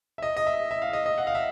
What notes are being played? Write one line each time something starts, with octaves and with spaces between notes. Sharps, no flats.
E5
D#5
D#5
E5
E5
F5
D#5
D#5
F#5
F5
E5